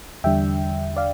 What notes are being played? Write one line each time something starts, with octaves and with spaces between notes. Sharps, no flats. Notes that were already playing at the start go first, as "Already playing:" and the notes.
E2 D3 G3 D4 E5 G5
D5 F5